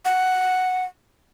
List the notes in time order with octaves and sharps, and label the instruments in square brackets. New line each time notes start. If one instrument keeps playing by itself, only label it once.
[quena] F#5